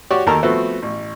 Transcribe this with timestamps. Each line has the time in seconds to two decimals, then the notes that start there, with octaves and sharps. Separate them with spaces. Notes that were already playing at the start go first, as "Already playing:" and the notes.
0.10 F#4 G4 C#5 D5 F#5
0.27 D#2 D#3 A4 A#4 A5 A#5
0.43 F3 A3 B3 C4 F#4 A4
0.83 A1